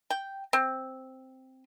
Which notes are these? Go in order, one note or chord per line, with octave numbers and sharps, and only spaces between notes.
G5
C4